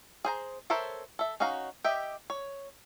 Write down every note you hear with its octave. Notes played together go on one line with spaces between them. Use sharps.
G#4 C5 A#5
A4 A#4 C5 C#5 E5
A4 E5
C#4 D#4 F#4 F5 A#5
G4 D#5 E5
C#5